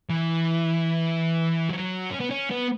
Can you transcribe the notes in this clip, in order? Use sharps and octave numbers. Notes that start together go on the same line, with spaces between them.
E3
F#3
C#4
B3
C#4
B3